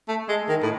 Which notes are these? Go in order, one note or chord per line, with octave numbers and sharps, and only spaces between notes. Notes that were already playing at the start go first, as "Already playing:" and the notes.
A3
G#3
D#3
A2